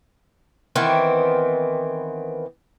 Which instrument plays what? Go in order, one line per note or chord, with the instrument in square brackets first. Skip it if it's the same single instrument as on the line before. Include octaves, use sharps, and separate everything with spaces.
[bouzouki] D#3 E3 B3 C4